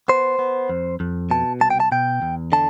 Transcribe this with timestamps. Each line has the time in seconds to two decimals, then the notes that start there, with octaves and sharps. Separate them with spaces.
0.08 B3 C5
0.39 B3
0.70 F2
1.00 F2
1.31 B2 A5
1.61 C2 A5
1.70 G5
1.80 A5
1.92 B2 G5
2.22 E2
2.52 D3 A5